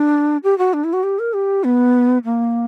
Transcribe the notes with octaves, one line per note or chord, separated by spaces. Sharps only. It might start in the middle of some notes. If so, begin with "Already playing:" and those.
Already playing: D4
G4
F#4
D4
E4
F#4
G4
A#4
G4
B3
A#3